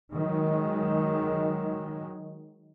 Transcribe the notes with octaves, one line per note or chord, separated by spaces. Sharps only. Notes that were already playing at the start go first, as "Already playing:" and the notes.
D#3 F#3 G#3